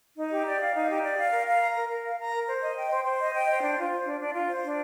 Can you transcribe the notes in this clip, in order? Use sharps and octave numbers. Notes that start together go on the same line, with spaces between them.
D#4
G4
D5
F5
D#4
G4
D5
F5
A#4
F5
A#5
A#4
A#4
F5
A#5
A#4
C5
D#5
G5
C5
C5
D#5
G5
C5
D4
F4
C5
D4
D4
F4
C5
D4